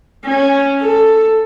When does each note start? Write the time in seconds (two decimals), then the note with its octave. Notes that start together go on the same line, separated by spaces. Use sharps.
0.25 C#4
0.81 A4